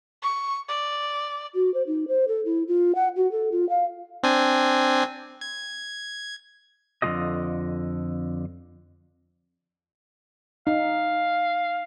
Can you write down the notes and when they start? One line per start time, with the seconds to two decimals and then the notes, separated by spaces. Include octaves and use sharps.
0.23 C#6
0.68 D5
1.54 F#4
1.74 C5
1.87 D#4
2.08 C5
2.28 A4
2.45 E4
2.68 F4
2.95 F#5
3.16 F#4
3.32 A4
3.52 F4
3.70 F5
4.23 C4 D4 G#5
5.41 G#6
7.02 F2 D3 G3 F4 G4 D#5
10.67 D#4 F5